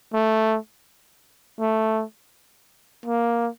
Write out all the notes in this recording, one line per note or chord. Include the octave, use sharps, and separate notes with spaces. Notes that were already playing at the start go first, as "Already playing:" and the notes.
A3
A3
A#3